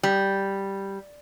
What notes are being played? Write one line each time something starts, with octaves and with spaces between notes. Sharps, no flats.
G3